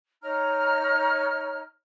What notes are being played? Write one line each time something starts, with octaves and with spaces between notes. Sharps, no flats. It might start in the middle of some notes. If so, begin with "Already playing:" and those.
D#4 C#5 A#5 F6